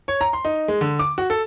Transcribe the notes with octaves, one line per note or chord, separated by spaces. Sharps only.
C#5
A#5
C6
D#4
G#3
D3
D6
F#4
A4